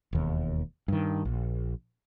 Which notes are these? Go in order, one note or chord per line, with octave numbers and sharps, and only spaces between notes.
E1 D#2
G2 D#3
A#1